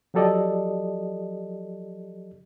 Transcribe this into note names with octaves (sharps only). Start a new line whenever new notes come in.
F3 F#3 G4 A4 D5 D#5